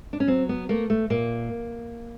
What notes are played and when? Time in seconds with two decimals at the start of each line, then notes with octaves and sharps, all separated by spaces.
0.13 D4
0.20 C#4
0.27 F#3 C4
0.49 B3
0.69 A3 A#3
0.90 A3
1.10 A#2 A#3